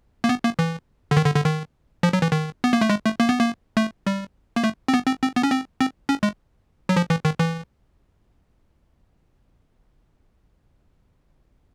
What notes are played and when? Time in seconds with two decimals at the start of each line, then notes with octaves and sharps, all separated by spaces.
0.24 A#3
0.29 B3
0.44 A#3
0.59 E3
1.11 D3
1.17 D#3
1.25 D3
1.36 D3
1.45 D#3
2.03 F3
2.13 F#3
2.22 E3
2.32 D#3
2.64 B3
2.73 A#3
2.81 A3
2.90 G#3
3.05 A3
3.20 A#3
3.29 B3
3.39 A#3
3.77 A3
4.07 G3
4.56 A#3
4.64 A3
4.88 C4
4.94 B3
5.07 C4
5.22 C4
5.36 B3
5.43 C#4
5.51 C4
5.81 C4
6.09 C#4
6.23 G#3
6.89 F#3
6.96 F3
7.10 E3
7.25 D#3
7.39 E3